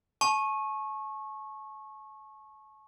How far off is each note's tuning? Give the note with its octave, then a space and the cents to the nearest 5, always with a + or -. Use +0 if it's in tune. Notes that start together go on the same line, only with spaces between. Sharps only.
A5 -40 C#6 -20